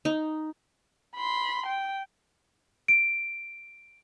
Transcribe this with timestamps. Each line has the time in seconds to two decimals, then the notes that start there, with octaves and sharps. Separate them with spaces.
0.05 D#4
1.16 B5 C6
1.66 G5
2.88 D7